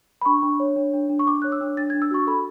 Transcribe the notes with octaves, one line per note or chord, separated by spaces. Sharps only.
B5
D4 C#6
D4
C#5
D4
D4
D4
C#6
D4 D6
C#5 F#6
E6
D4
D4 A6
G#6
D4
E6
F#4 C#6
A4 B5